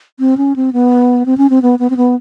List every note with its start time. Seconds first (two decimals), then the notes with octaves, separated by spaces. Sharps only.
0.20 C4
0.37 C#4
0.56 C4
0.73 B3
1.26 C4
1.38 C#4
1.50 C4
1.62 B3
1.79 B3
1.90 C4
1.97 B3